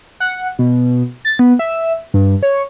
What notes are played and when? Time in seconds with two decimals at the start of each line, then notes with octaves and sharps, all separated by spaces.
0.20 F#5
0.59 B2
1.25 A6
1.39 B3
1.59 E5
2.14 G2
2.43 C#5